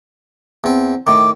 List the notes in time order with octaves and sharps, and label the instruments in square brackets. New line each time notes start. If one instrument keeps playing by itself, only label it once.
[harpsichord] E2 C4
[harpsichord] A2 D#3 [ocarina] D6